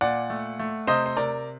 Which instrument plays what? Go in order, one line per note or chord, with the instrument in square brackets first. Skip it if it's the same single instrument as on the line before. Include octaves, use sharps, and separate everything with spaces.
[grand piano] A#2 D5 F#5
A3
A3
C3 C5 D#5
C5
C3 A#4 D5